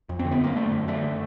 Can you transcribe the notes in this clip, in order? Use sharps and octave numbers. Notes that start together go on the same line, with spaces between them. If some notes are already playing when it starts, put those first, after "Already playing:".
F2
C4
D3
B3
F#2 A#3
D3 A3
F#2
D3 A3